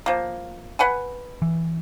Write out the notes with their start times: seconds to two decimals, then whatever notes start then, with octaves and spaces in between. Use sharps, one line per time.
0.06 F3 A#3
0.79 B4 F#5 G#5
1.42 E3